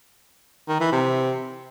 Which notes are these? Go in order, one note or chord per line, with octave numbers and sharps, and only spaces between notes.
D#3
E3
C3